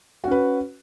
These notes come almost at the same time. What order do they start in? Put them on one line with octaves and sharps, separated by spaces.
F#4 C#4 B4